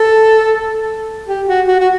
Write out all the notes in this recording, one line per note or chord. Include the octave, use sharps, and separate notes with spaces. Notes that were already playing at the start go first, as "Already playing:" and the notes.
Already playing: A4
G4
F#4
F#4
F#4